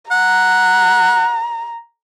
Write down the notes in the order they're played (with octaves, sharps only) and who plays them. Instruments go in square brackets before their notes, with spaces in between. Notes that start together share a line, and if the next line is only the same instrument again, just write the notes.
[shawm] F#5 [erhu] A#5